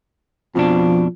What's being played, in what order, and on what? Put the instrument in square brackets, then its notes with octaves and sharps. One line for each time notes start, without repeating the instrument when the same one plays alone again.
[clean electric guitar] F2 B2 D4 [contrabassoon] F3